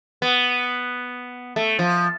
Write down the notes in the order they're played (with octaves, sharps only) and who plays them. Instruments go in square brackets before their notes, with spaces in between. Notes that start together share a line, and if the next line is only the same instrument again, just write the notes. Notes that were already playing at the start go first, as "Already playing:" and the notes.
[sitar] B3
A3
F3